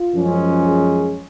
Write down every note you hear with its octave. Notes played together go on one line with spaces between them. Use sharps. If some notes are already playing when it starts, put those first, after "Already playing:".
Already playing: F4
F#2 F3 G#3 C#4
G#4